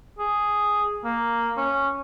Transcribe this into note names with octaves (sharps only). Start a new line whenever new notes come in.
G#4
A#3
C#4